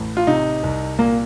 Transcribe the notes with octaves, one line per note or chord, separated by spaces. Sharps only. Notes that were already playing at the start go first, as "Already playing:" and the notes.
Already playing: A1 A2
F4
C3 D#4
C2
A#2 A#3